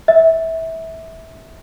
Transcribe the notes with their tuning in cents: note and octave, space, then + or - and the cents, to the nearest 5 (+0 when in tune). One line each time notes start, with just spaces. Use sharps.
E5 -20